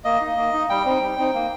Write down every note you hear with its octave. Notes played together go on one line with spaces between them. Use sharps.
A#3 D#5
D#4
A#3
D#4
G3 G5
C4 D#4
G3
C4 D#4
A#3